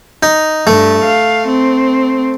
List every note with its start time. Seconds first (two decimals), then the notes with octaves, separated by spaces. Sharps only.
0.23 D#4
0.67 G2 A3
1.04 F5
1.47 C4